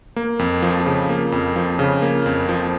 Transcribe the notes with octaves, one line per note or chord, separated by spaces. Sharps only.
A#3
F2
F3
C#3
A#3
F2
F3
C#3
A#3
F2
F3